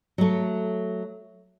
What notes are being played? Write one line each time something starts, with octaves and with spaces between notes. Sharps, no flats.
F#3 A3